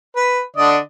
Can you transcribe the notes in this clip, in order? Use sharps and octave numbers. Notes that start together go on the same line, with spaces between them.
B4
D3 D5 D#5